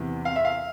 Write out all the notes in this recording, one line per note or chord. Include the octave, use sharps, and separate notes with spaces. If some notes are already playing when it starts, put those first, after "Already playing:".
Already playing: E2 C3 E3
F5
E5
F5